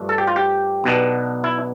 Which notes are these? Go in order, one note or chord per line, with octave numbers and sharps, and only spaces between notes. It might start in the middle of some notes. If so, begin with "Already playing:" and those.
Already playing: G2 F3 A3 D4
A4
G4
F4
G4
B1 B2 B3 D4
E4